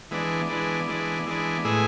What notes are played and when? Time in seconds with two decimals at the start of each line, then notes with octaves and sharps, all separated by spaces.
0.11 E3 G#3 B3 D4
0.49 E3 G#3 B3 D4
0.88 E3 G#3 B3 D4
1.26 E3 G#3 B3 D4
1.65 A2 G#3 B3 E4 G#4